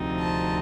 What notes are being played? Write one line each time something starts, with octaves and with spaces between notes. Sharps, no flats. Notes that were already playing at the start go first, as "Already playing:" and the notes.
Already playing: D2 C3 F3 C4 D#4
A5